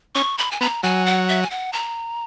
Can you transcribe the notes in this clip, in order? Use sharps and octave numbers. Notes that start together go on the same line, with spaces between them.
C#4 C#6
B5
G#5
B3 A#5
F#3 G#5
F#5
E5
G#5
F#5
A#5